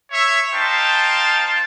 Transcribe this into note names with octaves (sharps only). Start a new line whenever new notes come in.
C#5 E5
D#4 C5 F5 G5 A5